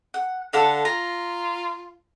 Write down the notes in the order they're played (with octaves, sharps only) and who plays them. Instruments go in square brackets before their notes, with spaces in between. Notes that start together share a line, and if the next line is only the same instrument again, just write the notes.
[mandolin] F#5
[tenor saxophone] D3 [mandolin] A4 F5 F#5
[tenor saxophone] F4 [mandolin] A#5